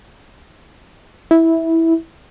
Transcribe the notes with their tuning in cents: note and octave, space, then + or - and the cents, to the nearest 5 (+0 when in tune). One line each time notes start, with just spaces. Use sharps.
E4 -10